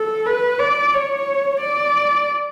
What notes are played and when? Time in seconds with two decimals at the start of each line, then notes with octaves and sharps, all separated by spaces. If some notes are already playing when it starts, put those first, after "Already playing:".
Already playing: A4
0.26 B4
0.59 D5
0.93 C#5
1.60 D5